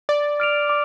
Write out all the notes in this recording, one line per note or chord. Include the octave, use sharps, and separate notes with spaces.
D5 D6
F6 D7 F7
D6